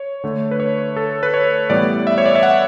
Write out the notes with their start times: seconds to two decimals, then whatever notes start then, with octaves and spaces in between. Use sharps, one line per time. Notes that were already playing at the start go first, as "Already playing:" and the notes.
Already playing: C#5
0.24 D3 A3
0.51 B4
0.60 C#5
0.96 A4
1.23 B4
1.34 C#5
1.70 A2 E3 G3 B3 D5
2.07 E5
2.18 C#5
2.26 D5
2.35 E5
2.43 F#5